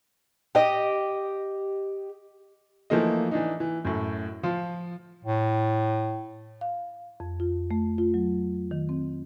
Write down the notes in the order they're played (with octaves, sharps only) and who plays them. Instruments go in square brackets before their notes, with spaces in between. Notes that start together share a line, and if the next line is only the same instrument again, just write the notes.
[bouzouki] G4 D#5
[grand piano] E3 F3 A3 A#3 D#4 D#5
E3 D4 D#4
E3
F#2 A2
F3 F4
[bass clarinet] A2
[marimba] F5
F2
F4
A3
F4
F#3
D#3
C4